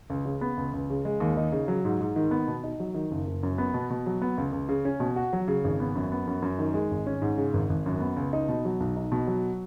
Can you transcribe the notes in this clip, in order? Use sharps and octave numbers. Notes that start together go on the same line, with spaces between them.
C#2
C#3
B3
C#2
C#2
C#3
G#3
D#2
D#4
C#3
F#3
G#2
G#2
D#3
B3
B2
D#4
F#3
D#3
F#1
F#1
F#2
B3
B2
B2
F#3
B3
C#2
C#2
C#3
C#4
B2
F#4
F#3
C#3
G#1
B3
F#2
B3
F#2
F#2
D#3
G#3
G#1
C#4
G#2
C#3
G#1
G#1
F#2
B3
C#2
D#4
B2
F#3
B1
D#4
B2
F#3